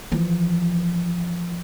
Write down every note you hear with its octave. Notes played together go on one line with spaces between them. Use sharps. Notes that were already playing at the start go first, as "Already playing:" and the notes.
E3 F3